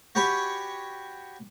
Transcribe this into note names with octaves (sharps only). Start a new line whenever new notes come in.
F#4 G4 C#5 G#5 B5